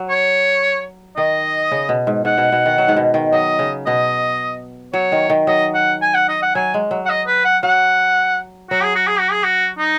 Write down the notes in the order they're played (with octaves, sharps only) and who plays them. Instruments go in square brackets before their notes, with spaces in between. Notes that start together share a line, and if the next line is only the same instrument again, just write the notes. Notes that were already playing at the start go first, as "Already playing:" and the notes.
Already playing: [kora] F#3
[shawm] C#5
[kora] D#3 [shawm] D#5
[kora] C#3
B2
G#2
[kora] G#2 [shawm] F#5
[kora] B2
B2
D#3
F#3
G#2
B2
D#3
[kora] F#3 [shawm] D#5
[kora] C#3
[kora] B2 [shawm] D#5
[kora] F#3 [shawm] C#5
[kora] D#3
D#3
[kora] F#3 [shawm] D#5
[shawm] F#5
G#5
F#5
D#5
F#5
[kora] F#3 [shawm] G#5
[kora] G#3
F#3
[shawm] F#5
D#5
B4
F#5
[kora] F#3 [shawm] F#5
[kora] F#3 [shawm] F#4
[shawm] G#4
F#4
G#4
F#4
G#4
F#4
D#4